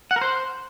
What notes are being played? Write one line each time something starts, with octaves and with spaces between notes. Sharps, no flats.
F#5
A#4
C5